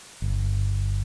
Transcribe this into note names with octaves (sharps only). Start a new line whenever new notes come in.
G1